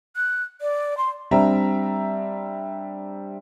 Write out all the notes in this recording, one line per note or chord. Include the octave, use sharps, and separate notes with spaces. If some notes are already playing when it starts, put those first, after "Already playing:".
F#6
D5
C6
G3 C4 D4 E5 A#5